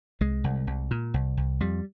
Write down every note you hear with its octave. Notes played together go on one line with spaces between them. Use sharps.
C2 G#3
C2
C2
A#2
C2
C2
F2 G3